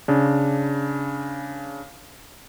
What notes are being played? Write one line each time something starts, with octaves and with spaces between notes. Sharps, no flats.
C#3 D4